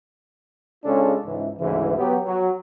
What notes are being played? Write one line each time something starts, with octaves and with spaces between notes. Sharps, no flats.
C#3 G#3 C#4 D4 F4 A4
C#2 G#2 E3
D2 G#2 C#3 E3
F#3 B3 G4
F#3